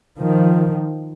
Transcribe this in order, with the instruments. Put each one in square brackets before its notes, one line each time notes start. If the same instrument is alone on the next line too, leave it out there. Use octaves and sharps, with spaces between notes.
[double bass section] D#3 F3